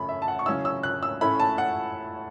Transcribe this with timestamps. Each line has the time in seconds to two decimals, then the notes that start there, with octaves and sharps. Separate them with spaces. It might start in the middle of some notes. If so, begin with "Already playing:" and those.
Already playing: F#2 C#3 A3 C#4 B5
0.09 E5
0.22 A5
0.28 F#5
0.39 C#6
0.46 C#3 F#3 C#4 E4 E6
0.65 E6
0.83 F#6
1.03 E6
1.21 A2 A3 C#4 E4 B5
1.40 A5
1.58 F#5